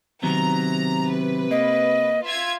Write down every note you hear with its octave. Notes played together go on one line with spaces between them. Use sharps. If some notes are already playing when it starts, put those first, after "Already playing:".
C3 D#3 F#3 B3 A#5
B4
A#3 D#5
F4 E5 G#6